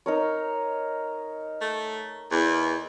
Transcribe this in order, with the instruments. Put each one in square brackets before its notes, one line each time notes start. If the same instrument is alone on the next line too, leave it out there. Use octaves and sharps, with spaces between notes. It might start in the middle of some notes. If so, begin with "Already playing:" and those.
[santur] D#4 A#4 C#5
[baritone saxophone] A3
E2